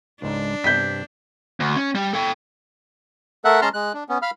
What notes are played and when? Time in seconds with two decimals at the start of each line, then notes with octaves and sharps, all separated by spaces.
0.22 C#2 G#2 D4 D#4
0.64 G2 C3 G6 B6
1.60 D2
1.76 C#4
1.95 G3
2.13 A4 G5
3.45 A3 A4 A#4 E5 F#5 F#6
3.62 G#3 C#4 A5 A#5 C6 F6
3.74 G#3 F#6
3.94 D4
4.09 B3 C#4
4.22 F5 B5 F6